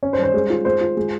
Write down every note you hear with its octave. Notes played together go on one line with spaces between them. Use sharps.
C#4
C5
G3
C5
G#3
F4
G#3 C5
F4
G#3